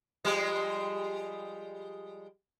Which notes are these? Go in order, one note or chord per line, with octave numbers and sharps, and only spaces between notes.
F3 G3 G#3